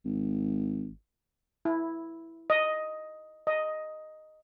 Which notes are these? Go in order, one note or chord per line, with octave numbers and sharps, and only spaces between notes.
G#1
E4
D#5
D#5